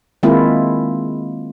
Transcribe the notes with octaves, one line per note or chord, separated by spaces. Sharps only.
D#3 G#3 A#3 C4 E4 F4